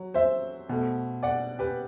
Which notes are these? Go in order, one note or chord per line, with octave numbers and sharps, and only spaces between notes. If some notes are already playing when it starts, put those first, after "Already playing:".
Already playing: F#3
C5 E5
B2 A3
D5 F#5
G4 B4